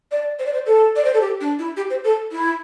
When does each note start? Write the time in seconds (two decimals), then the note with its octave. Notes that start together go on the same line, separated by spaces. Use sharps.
0.12 D5
0.39 C5
0.46 D5
0.53 C5
0.66 A4
0.96 D5
1.05 C5
1.14 A4
1.21 G4
1.41 D4
1.59 E4
1.77 G4
1.90 C5
2.04 A4
2.32 E4